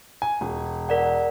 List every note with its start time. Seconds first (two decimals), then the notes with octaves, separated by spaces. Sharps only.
0.22 G#5
0.41 E1
0.89 A#4 D5 F#5